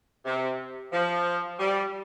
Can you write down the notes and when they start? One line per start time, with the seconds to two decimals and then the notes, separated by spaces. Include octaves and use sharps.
0.25 C3
0.92 F3
1.59 G3